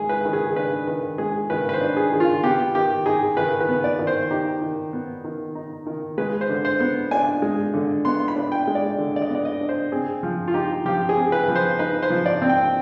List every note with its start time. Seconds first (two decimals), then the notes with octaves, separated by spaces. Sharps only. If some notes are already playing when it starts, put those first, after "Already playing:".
Already playing: D#3 G#3 G#4
0.09 B4
0.25 D#3
0.33 G#4
0.56 D4 B4
0.87 D#3 B4
1.18 G#3 G#4
1.50 D#3 B4
1.69 B4
1.73 C5
1.81 D4
1.97 G#4
2.12 D#3
2.20 F4
2.43 B3 G4
2.75 D#3 G4
3.06 D#4 G#4
3.37 D#3 B4
3.60 B4
3.69 B3
3.84 D5
3.99 D#3
4.07 C5
4.30 D#4 G4
4.62 D#3
4.93 B3
5.24 D#3
5.55 D#4
5.86 D#3
6.18 G#3 B4
6.41 C5
6.49 D3
6.65 C5
6.80 B3
7.11 D4 G#5
7.42 G#3
7.74 D3
8.05 B3 C6
8.28 B5
8.36 D4
8.52 G5
8.67 G#3
8.75 D5
8.98 D3
9.16 D5
9.22 D#5
9.29 B3
9.35 D5
9.45 D#5
9.61 D4
9.69 C5
9.92 C4 G#4
10.23 F3
10.48 F4
10.54 D#4 G4
10.85 F3 G4
11.09 G#4
11.17 C4
11.32 B4
11.48 F3
11.56 C5
11.79 D#4 B4
12.03 C5
12.10 F3
12.26 D5
12.42 C4
12.49 G5